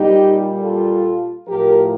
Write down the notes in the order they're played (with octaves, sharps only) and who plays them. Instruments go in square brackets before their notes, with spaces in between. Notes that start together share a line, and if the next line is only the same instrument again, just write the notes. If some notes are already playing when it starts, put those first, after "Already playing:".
Already playing: [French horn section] A#2 G3 D#4 G4
F4 A4
A2 F3 G4 A#4